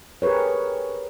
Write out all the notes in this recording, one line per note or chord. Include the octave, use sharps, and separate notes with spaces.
G4 G#4 A#4 B4 C#5